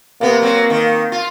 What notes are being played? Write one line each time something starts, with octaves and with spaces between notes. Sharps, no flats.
C3 A#3 B3
F#3 C4
D#3
F4